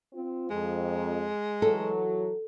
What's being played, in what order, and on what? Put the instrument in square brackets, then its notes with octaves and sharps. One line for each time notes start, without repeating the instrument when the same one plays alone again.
[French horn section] C4 F4
[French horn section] F2 [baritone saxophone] G#3
[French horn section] E3 F#3 [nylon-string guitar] A4